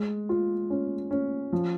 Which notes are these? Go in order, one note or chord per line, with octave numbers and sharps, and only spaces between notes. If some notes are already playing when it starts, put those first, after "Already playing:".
Already playing: G#3
F4
C#4
C#4
F3